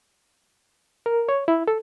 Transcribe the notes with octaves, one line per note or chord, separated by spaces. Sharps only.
A#4
C#5
E4
A4